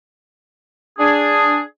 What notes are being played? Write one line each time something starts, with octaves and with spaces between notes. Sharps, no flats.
D4 G#4